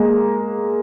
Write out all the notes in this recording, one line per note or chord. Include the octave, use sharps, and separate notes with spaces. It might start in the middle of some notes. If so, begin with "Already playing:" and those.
Already playing: G#3 A#3